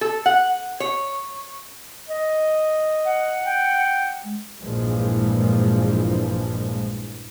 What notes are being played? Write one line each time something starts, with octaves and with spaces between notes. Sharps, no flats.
A4
F#5
C#5
D#5
F#5
G5
G#3
A#1 G2 A#2 E3 F3 G#3